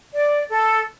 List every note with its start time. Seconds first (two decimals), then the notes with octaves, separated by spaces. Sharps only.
0.13 D5
0.50 A4